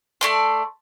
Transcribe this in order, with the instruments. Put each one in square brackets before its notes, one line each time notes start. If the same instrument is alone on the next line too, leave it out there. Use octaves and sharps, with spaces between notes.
[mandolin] A3 D5 C6